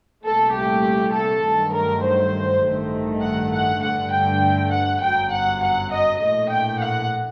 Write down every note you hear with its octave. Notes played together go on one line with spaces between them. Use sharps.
C2 A#2 A3 A4
G4
A4
G2 D#3 F#3 A3
A#4
C5
A1 G2 D#3 A3
F#5
F#5
G2 D3 A3 F#5
G5
F#5
G1 F#2 F#3 G5
F#5
F#5
D#5
A#1 A2 A3 D#5
G5
F#5